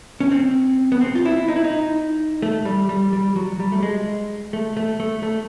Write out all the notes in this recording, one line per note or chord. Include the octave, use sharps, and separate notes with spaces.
C#4
C4
B3
C4
F4
E4
D#4
E4
D#4
A3
G3
G3
G3
F#3
G3
A3
G#3
A3
A3
A3
A3